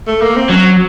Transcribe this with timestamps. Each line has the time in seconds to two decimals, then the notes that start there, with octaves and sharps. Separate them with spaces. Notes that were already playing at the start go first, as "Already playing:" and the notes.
0.08 A3
0.21 A#3
0.36 C4
0.50 F#3 C#4